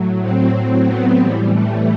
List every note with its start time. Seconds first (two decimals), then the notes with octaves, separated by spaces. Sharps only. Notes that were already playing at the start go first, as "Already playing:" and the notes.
Already playing: A2 F#3
0.20 C4
0.86 B3
1.19 A2 E3 G3
1.51 A3